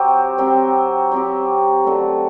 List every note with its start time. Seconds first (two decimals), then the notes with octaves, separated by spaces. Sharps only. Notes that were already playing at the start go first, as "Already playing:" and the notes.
Already playing: F#3 C4 G4
0.38 F#3 C4 G4
1.12 F#3 C4 G4
1.84 D3 F#3 A3